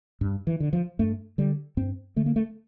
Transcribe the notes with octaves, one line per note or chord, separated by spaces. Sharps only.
G2
E3
D3
F3
G2 A3
D3 G3
G2 C4
D3 A3
A#3
A3